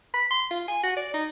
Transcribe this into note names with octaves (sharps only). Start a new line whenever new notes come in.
B5
C6
F4
G#5
F#4
D5
D#4